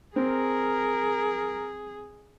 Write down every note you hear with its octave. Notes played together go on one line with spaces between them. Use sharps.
C4 G#4 A#4